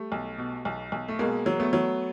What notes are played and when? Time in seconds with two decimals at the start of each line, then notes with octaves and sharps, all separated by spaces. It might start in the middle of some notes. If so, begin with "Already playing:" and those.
Already playing: G3 A3
0.12 B1
0.38 B2
0.65 B1
0.92 B1
1.08 A3
1.19 B2 G#3 A#3
1.46 F#3
1.60 A3 B3
1.73 F#3